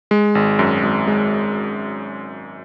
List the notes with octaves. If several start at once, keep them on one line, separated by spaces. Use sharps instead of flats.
G#3
G#1
F#2
G#1
G#3